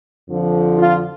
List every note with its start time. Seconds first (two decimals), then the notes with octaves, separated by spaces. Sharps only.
0.29 F2 D3 F3
0.78 F4